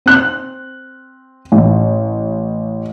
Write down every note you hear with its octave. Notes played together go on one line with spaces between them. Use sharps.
C4 F#6
A1